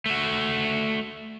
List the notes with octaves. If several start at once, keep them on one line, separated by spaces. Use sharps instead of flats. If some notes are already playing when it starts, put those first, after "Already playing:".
A3 F#4